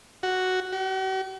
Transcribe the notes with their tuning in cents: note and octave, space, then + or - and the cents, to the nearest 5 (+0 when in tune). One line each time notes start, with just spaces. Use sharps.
F#4 +0
F#4 +45